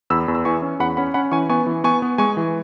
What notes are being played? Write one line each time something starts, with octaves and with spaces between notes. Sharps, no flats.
E2 B5 E6
E2
E6
E3 G#5 C#6
C#4
E2 F#5 B5
C#4 F#5 B5
C#4 F#5 B5
E3 G#5 C#6
B3 G#5 C#6
E3
B3 G#5 C#6
B3
G#3 G#5 C#6
E3